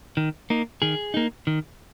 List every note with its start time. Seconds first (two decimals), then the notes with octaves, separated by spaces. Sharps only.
0.17 D#3
0.50 A#3 D#4
0.82 D#3 G#4
1.14 A#3 D#4
1.47 D#3